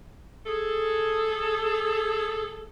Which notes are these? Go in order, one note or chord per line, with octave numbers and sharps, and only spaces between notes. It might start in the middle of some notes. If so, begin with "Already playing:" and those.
G#4 A4